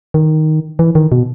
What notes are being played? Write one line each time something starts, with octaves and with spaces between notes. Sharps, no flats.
D#3
E3
D#3
B2